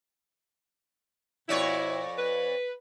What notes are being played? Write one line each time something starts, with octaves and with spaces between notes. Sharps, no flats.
F2 B2 E4 C#5 D5
B4